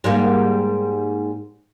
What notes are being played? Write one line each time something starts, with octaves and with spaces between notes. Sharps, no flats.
G#2 G3 A#3